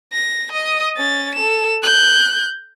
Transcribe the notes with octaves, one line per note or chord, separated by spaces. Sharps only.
A#6
D#5 D#6
C#4 A6
A4 E7
F#6 G6